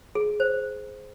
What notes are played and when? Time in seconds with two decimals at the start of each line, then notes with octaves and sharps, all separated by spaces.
0.15 G#4
0.40 C5